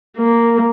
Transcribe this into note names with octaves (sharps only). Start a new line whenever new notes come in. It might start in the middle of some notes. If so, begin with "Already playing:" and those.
A#3